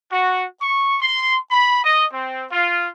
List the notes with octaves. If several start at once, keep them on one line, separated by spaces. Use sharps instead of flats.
F#4
C#6
C6
B5
D#5
C4
F4